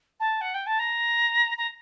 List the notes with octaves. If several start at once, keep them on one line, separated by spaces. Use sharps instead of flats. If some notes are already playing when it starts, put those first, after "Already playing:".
A5
F#5
G5
A5
A#5
A#5